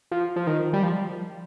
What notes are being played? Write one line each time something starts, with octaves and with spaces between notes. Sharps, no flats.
F3
F3
D#3
G3
F3